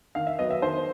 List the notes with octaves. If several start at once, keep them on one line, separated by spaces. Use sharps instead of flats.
D#3 F5
E5
F#3 B3 D#5
E5
D#3 C5